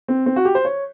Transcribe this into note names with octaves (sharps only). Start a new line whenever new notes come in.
C4
C4
F#4
G4
C5
C#5